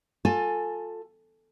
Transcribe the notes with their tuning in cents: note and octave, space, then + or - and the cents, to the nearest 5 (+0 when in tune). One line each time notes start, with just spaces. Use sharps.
F4 +30 A4 +10 G#5 +0